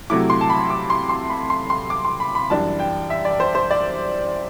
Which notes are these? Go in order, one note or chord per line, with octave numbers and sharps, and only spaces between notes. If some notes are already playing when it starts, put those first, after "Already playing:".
C3 F#3 A3 E4 D6
C6
A5
B5
D6
C6
C6
B5
C6
C6
D6
C6
B5
B5
F#2 E3 G3 D4 A5
G5
E5
D5
C5
C5
D5